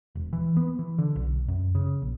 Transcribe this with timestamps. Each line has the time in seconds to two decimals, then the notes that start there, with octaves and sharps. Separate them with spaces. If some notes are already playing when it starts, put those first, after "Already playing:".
0.15 E1
0.33 E3
0.57 B3
0.79 E3
0.98 D3
1.16 B1
1.48 F#2
1.75 C#3
2.02 A#1